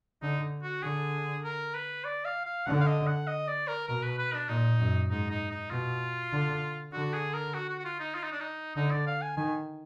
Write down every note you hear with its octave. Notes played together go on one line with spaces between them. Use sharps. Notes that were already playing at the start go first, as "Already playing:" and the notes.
D3 D#4
F#4
D3 G#4
A#4
B4
D5
F5
F5
D3 F#5
F5
D#5
F#5
D#5
D5
A#4
B2 A#4
B4
B4
D4
A#2 D#4
F#2
G#2 D#4
D#4
D#4
B2 F4
D3
D3 F#4
G#4
A#4
F#4
F#4
F#4
F4
D#4
F4
D#4
D4
D#4
D3 D#4
D5
F5
G#5
D#3 G#5